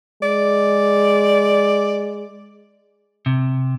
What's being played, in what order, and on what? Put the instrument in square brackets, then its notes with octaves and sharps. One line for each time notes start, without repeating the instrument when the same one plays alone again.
[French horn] G#3 [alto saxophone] D5
[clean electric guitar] C3